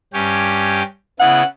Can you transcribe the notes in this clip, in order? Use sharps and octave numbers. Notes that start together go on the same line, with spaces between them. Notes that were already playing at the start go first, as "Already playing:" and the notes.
G2 C#4 G4
C#3 B3 E4 F#5